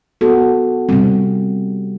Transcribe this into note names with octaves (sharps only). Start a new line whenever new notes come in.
B3 F#4 A4
C3 G3 C4